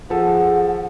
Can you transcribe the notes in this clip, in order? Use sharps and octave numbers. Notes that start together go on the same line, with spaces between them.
F3 G#4 A4 F#5